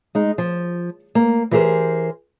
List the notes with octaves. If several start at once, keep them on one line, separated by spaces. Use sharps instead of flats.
G#3 D#4
F3
A#3
E3 G4 G#4 A#4 C5